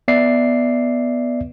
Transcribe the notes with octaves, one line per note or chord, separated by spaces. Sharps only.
B3 D5 E5 C7